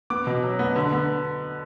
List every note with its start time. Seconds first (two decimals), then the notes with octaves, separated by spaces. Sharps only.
0.10 B3 D6
0.27 B2
0.43 F#3
0.59 B3
0.76 D3
0.92 B3